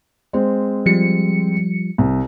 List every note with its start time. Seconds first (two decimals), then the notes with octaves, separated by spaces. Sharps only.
0.33 G#3 C4
0.86 F3 G3 C#7
1.98 C2